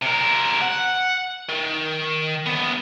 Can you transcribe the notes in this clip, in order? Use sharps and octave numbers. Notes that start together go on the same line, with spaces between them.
C3 A#4
F#5
D#3
C2 B3